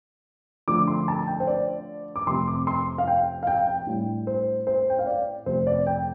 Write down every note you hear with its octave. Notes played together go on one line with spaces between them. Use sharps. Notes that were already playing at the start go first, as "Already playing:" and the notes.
D3 F3 A3 D4 D6
C6
A5
G5
C5
D5
D6
F2 C3 A3 C4 C6
D6
C6
F5
G5
F5
G5
G5
A2 G3 D4
C5
C5
G5
F5
D5
F2 C3 A3 C5
D5
G5